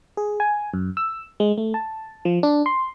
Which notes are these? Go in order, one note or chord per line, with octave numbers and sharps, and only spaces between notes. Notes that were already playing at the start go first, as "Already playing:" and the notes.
G#4
G#5
F#2
E6
G#3
A3
A5
F3
D4
C6